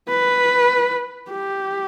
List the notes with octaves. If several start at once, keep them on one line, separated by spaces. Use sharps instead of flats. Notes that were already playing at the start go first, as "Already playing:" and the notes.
B4
G4